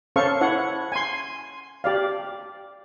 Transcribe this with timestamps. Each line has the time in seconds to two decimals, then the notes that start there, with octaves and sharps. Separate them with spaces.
0.16 C#4 A4 C5 F5 C#6
0.41 E4 C#5 F#5
0.92 G#5 C6
1.84 G4 D5 F5